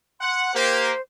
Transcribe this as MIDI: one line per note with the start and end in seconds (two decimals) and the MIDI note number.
0.21 0.53 78
0.21 0.54 84
0.54 0.91 58
0.54 0.91 67
0.54 1.01 72